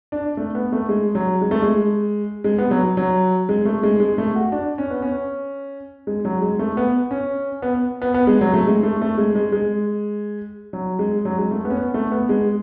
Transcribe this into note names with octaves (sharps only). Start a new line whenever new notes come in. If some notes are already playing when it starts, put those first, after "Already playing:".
D4
A3
B3
A3
G#3
F#3
G#3
A3
G#3
G#3
B3
F#3
F#3
G#3
A3
G#3
G#3
A3
F#4
D4
C#4
B3
C#4
G#3
F#3
G#3
A3
B3
C#4
B3
B3
B3
G#3
F#3
A3
G#3
A3
A3
G#3
G#3
G#3
F#3
G#3
F#3
G#3
A3
B3
C#4
B3
A3
B3
G#3